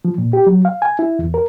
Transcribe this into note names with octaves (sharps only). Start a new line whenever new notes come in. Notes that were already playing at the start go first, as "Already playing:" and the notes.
F3
A#2
G4
F#3
F5
G#5
E4
E2
A#4